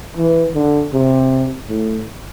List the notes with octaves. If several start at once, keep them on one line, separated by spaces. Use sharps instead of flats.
E3
D3
C3
A2